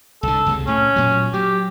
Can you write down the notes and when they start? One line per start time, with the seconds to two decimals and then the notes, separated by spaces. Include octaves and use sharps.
0.23 C2 D3 A4
0.46 C#2 C3 G#3
0.67 A2 C#4
0.96 A#2 F#3
1.33 F#3 G4